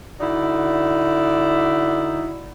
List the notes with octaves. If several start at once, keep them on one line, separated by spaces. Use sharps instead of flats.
D3 D#4 E4 F#4 D5